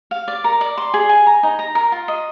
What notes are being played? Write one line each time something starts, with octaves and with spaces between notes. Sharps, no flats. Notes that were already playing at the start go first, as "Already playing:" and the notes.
F5
D5
A#4
D5
C6
G#4
G#5
A#5
D#4
A#5
A#4
F4
D#5